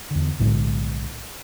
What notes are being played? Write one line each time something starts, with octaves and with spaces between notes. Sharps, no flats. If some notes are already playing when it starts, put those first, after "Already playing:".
E2 D3
B1 A2 D3 G#3